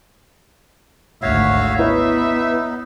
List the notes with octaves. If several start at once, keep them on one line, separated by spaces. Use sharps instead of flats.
G#1 D2 F#4 C#5 E5 F5
B3 D#4 E4 B4 C#5